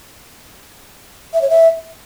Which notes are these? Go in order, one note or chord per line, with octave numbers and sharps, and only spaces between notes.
E5
C#5
E5